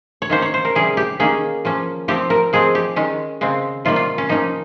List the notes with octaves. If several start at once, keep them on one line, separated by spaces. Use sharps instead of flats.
C#5
D#3 A#3 C#4 C5
C#5
C5
A#4
C3 G3 C#4 G#4
G4
D#3 A#3 C#4 G#4
F3 A#3 C#4
F3 C4 G4
A#4
F3 G#3 C4 G#4
G4
D#3 G#3 C#4
C#3 G#3 C4
C3 D#3 G3 A#3 F4
F4
C#4
F3 A#3 C#4 D#4